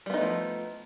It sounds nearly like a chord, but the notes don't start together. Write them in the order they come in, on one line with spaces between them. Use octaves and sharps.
G3 B3 D#4 A3 F3